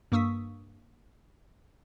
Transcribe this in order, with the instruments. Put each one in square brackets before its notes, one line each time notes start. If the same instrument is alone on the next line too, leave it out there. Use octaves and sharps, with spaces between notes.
[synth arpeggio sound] G2 A#3 C#6 D#6 E6 B6